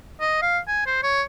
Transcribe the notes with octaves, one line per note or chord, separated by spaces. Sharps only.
D#5
F5
G#5
C5
C#5